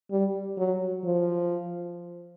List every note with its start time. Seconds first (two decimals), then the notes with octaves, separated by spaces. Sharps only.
0.11 G3
0.58 F#3
1.04 F3